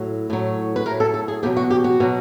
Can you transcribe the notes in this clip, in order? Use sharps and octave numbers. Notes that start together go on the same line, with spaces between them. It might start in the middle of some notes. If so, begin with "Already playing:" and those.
Already playing: A2 F#3
A2 F#3
B4
A2 F#3 A#4
A4
A4
G#4
E2 B2 F#3 G4
F#4
G4
F#4
B2 F#3